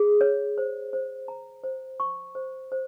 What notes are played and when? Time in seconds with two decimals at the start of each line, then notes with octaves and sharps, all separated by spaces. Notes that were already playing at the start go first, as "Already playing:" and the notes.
Already playing: G#4
0.21 C#5
0.58 C5
0.93 C5
1.28 A#5
1.64 C5
2.00 C#6
2.35 C5
2.72 C5